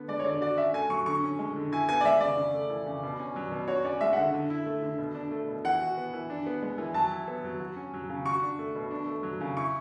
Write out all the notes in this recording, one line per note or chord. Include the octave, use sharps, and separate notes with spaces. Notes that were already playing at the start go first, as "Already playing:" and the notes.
Already playing: D3 B3
G#3 D5
C#5
D3 D5
F#4 D5
C#4 E5
A3 G#5
F#3 C#6
D3 C#6
C#4
G#3
D3
E4 G#5
B3 G#5
D5
G#3 E5
C#3 D5
C#3
A3
E3
C#3
B2
C#4
F#3
B2
F#4 C#5
C#4 D5
G#3 E5
F#5
D3 E5
D3
E4
A3
D3
B2
D4
A3
B2
E3 F#5
F#4
B3
E3
D4
B3
G#3
E3
F#3 A5
E4
B3
F#3
F#4
C#4
F#3
C#3
F#4 C#6
D4
A3
B2
D4
A3
F#3
C#3
E4 C#6